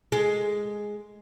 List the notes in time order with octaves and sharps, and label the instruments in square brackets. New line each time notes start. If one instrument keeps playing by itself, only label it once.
[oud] G#3